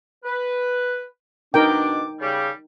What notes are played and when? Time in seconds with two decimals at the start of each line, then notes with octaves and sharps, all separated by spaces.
0.24 B4
1.54 B2 D4 D#4 A#4 G5 D6
2.20 C#3 G3